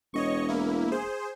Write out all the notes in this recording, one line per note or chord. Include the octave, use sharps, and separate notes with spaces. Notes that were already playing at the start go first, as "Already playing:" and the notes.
E1 C#5 D#5 C#6
A#3 E4
G#4 C5